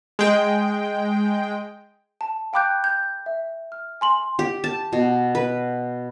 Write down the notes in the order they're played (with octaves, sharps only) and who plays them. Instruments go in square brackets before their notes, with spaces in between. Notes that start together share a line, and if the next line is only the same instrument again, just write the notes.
[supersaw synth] G#3 G5
[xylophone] A5
F5 G5 B5 D6 F#6 G6
G6
E5
F6
G#5 C6 F#7
[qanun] G4
A5
B2
B4